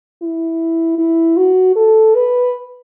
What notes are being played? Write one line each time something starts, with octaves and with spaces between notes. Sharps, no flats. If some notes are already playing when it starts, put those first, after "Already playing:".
E4
E4
F#4
A4
B4